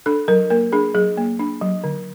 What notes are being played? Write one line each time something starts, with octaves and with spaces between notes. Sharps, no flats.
D4 A4
F#3 A#4
A#3 A#4
D4 G#4
F#3 G#4
A#3
D4
F#3
D3